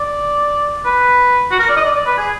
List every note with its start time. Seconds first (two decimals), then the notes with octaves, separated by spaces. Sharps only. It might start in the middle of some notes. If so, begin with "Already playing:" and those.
Already playing: D5
0.85 B4
1.51 F#4
1.60 A#4
1.69 D5
1.77 D#5
1.84 D5
1.96 D5
2.06 B4
2.18 G#4